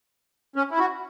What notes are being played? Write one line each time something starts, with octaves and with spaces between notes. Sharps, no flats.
C#4
E4
F#4